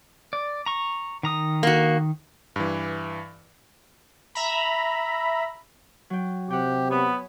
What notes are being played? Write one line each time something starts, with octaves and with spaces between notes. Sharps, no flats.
D5
A#5 C#6
D#3 A#5 D#6
A#3 F#4
G2 E3
E5 A#5 B5
F#3 G5
C3 G4 F#5 G5
B3 C#5 G#5 B5